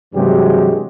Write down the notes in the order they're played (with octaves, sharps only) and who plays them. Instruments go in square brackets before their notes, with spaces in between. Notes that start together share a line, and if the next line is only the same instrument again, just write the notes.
[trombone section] G2 C3 E3 F#3 G#3 G4